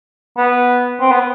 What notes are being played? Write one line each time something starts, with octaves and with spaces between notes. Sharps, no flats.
B3
C4
B3